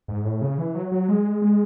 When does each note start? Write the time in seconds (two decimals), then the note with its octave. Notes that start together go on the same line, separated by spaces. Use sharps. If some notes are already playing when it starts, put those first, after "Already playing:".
0.08 G#2
0.25 A2
0.41 C#3
0.58 E3
0.75 F#3
0.92 F#3
1.08 G#3
1.42 G#3